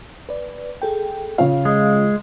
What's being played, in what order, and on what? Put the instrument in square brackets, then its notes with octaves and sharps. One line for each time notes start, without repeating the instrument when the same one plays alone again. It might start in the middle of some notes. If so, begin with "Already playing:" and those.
[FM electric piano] B4 D5
G#4 A4 G5
[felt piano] C#3 C#5 F5 [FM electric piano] F4
[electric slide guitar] G#3